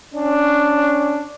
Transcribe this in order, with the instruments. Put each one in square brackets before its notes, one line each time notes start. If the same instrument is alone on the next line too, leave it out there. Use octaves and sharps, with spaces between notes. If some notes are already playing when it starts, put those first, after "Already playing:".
[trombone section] C#4 D4